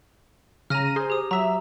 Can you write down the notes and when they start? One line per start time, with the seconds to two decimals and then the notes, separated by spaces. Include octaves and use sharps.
0.70 C#3 A#5 F6 A#6 D#7
0.96 G#4 C5
1.10 G4 D#6
1.31 F#3 E5 A#5